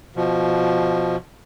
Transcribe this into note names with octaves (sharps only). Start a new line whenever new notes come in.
B2 F3